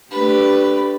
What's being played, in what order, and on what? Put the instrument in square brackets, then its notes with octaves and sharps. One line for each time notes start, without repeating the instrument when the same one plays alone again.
[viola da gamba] A3 D4 G4 [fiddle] B4